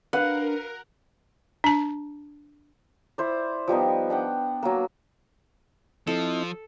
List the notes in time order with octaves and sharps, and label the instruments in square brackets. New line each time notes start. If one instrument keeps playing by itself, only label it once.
[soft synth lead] D4 [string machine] A#4 [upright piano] B4 F5 [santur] F#5
[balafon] D4 A5
[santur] E4 C5 D5
F3 G3 B3 D#4
D4 F#5 G5
F#3 A#3
[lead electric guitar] F3 [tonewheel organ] C4 E4 D#5 [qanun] A4